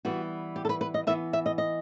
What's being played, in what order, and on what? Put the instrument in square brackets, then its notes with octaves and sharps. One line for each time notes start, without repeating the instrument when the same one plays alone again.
[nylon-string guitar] E3 G3 B3 F#4
G4
A4
B4
B4
D#5
E3 B3 E5
E5
D#5
D#5